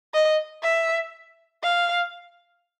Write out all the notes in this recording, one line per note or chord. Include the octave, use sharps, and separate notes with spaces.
D#5
E5
F5